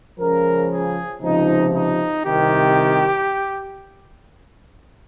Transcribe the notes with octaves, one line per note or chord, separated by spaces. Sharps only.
C#2 C#3 F3 A#4
G#4
C#2 C3 F3 D#4
D#4
C2 C3 D#3 G4